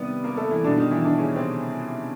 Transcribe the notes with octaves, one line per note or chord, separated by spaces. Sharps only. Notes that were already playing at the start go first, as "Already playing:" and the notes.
Already playing: C3 D#3 G3 B3 B4 D5
A#3 A#4
A3 A4
E3 E4
B2 D3 G3 D4
D#3 D#4
E3 E4
D3 D4
C#3 C#4
C3 C4